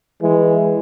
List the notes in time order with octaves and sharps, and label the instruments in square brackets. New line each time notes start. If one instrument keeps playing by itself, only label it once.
[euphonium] E3 [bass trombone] G#3